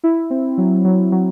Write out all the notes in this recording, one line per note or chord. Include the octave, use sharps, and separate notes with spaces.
E4
C4
F#3
F#3
F#3